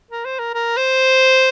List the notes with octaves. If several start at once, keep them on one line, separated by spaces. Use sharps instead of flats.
A#4
C5
A#4
A#4
C5